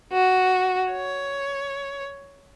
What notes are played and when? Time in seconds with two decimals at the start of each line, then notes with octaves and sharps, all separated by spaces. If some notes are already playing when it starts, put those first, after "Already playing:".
0.12 F#4
0.93 C#5